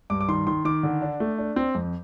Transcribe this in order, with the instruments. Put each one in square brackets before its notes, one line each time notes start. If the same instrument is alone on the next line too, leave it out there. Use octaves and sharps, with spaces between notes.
[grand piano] G2 D6
D6
D#3 C6
D#3 C6
D#3 D6
D3
D4
A3
D4
C4
F2